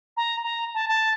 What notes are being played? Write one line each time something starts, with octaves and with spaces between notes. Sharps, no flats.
A#5
A#5
A5
A5